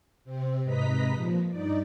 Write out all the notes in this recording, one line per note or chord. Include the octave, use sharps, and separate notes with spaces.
C3 C4
G#2 C3 B4 D#5 A#5 B6
A#2 F3
G2 D#4 D5